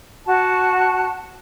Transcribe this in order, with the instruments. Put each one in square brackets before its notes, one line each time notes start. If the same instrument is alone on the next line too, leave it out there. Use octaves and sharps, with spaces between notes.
[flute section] F#4 A5